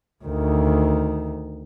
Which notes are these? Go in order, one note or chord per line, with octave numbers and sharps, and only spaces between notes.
D2 D#3